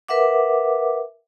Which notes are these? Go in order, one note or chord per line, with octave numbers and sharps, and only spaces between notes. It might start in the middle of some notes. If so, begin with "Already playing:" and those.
A#4 B4 E5 F#5 D6